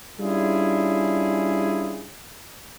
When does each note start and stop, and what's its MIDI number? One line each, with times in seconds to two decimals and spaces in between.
0.20 2.11 55
0.20 2.11 61
0.20 2.11 62
0.20 2.11 64
0.20 2.11 65
0.20 2.11 68